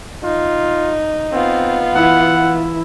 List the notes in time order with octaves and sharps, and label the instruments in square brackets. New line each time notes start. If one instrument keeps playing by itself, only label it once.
[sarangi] D#4 [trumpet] F4
[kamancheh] B3 F4 [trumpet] C4
[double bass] E3 E4 [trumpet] F#5